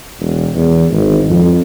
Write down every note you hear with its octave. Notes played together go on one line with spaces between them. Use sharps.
E1
E2
G#1
F2